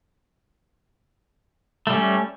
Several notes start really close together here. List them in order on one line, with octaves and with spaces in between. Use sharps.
A3 G3 C#4